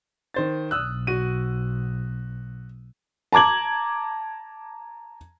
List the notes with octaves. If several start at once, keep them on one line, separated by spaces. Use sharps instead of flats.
D#3 C5 A6
B1 D#6 E6 F#6
F#4 D#7
A5 A#5 D6 G#6 F#7